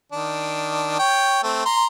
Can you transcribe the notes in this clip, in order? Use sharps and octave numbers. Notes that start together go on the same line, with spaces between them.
D#3 D4
C#5 G5
A3 C4
A#5 C6